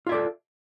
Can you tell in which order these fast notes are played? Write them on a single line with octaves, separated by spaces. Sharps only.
F4 E5 D5 A4